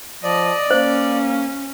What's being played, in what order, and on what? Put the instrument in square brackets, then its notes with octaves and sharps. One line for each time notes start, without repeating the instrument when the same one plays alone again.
[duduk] F3 [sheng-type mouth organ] D5 [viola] D#5
[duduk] A#3 [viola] C#4 [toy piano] C5